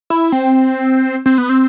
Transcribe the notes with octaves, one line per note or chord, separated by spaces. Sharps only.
E4
C4
C4
B3
C4